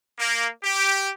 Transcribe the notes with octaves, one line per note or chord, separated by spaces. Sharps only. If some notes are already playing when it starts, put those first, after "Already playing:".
A#3
G4